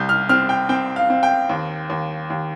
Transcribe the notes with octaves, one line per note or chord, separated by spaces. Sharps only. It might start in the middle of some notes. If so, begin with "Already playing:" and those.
Already playing: C2 G6
F6
C4 F6
G5
C4 G5
F5
C4
G5
D#2
D#2
D#2